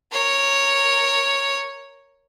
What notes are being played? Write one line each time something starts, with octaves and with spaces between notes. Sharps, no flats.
A#4 C#5